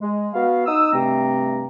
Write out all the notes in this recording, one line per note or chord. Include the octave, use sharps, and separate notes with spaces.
G#3
B3 F#4 F5
D#4 D#6 E6
G2 C3 A3 C4 A#5